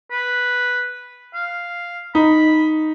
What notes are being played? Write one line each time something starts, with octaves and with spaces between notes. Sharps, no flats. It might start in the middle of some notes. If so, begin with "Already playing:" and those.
B4
F5
D#4 B5